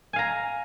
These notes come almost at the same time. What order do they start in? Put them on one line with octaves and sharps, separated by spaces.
G#5 F5 A#5